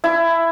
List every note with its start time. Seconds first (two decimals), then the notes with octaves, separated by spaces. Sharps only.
0.04 E4